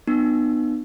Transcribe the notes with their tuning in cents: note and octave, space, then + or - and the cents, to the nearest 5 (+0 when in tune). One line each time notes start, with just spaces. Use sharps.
B3 +0 D#4 -45